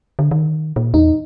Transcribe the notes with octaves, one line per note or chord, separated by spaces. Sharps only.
D3
D#3
A#2
E2 D#4